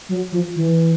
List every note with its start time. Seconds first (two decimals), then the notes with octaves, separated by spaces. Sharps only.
0.09 F#3
0.32 F3
0.56 E3